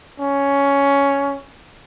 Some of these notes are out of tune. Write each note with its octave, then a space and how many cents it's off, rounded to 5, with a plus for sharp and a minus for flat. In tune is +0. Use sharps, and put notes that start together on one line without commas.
C#4 +10